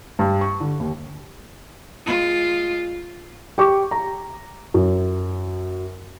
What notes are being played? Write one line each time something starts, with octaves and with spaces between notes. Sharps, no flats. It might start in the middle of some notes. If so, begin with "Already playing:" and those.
G2
C#6
D3
D#2
G#3 F4
G4 C#6 D6
A#5
F#2